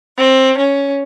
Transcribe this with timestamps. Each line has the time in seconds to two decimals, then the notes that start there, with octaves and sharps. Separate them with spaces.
0.17 C4
0.56 C#4